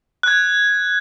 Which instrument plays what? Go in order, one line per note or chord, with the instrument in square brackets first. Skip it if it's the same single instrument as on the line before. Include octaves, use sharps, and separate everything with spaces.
[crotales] F#6 G#6